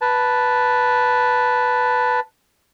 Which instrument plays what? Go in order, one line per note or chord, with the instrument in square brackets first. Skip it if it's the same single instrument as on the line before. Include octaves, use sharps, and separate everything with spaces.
[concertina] B4 A5